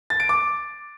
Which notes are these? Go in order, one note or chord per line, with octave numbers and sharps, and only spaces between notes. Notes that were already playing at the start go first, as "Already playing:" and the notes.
A6
D7
D6